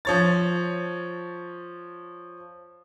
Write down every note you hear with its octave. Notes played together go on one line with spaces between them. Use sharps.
F3 C#5 A6